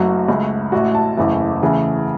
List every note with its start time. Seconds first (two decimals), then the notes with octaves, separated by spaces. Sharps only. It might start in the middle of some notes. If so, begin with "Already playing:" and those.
Already playing: F#1 F#2 F#3 A3 F#4
0.28 C#2 C#3 A3
0.72 A1 A2 A3 F#4
0.95 A5
1.17 F#1 E2 C#3 E3 A3
1.62 E2 C#3 E3 A3